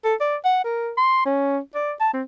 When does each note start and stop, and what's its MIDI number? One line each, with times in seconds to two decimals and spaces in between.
0.05 0.14 69
0.20 0.36 74
0.44 0.63 78
0.64 0.91 70
0.97 1.23 84
1.25 1.59 61
1.75 1.92 74
2.00 2.09 81
2.13 2.22 60